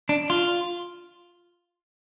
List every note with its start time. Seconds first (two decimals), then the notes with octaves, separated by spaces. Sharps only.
0.09 D4
0.30 F4